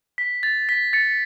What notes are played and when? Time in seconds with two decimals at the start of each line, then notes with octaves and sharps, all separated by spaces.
0.18 B6
0.43 A6
0.69 B6
0.93 A6 C#7